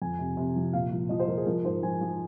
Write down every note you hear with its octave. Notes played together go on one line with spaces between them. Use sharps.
F2 G#5
C3
C3
F3
A#2 F5
F3
F3 D#5
C5
F3 A#4
G#4
F3 A#4
G#2 C5
F3 G#5
F3